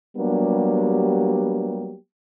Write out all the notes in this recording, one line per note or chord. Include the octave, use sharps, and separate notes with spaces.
F#3 G3 A#3 B3 D4 G4